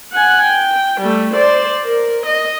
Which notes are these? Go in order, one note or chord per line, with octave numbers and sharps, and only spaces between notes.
F#5 G#5
G5
G3 A3
C5 D5
A#4
D#5